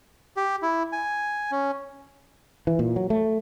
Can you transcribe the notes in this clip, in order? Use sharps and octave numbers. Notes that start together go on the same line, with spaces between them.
G4
E4
G#5
C#4
E3
A#2
F#3
A3